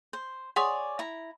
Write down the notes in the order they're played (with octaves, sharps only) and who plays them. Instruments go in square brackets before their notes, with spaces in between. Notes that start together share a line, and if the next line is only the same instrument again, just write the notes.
[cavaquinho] C5
[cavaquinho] G#4 C#5 D5 [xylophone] F#5 C6 D#6
[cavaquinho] E4 A#5